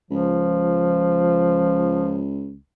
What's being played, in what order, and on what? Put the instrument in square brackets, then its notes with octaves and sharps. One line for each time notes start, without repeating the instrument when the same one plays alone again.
[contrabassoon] C#2 [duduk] F3